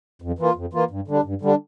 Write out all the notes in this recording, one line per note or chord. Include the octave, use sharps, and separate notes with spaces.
F2
E3 A#3 F4
F2
E3 A#3 F4
G2
D3 G3 D4
G2
D3 G3 D4